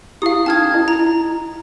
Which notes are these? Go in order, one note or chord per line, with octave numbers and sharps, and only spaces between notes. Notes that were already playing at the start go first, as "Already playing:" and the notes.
E4 G4 F5 D#6
C#4 D#4 A5 D#6 F6 G#6
E4 D#5
A#5
E4